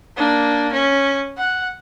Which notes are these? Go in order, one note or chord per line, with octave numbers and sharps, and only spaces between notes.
A#3 D4
C#4
F#5